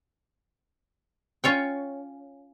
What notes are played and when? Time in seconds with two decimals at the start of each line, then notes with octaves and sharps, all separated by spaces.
1.44 C#4 F4 C#5 G5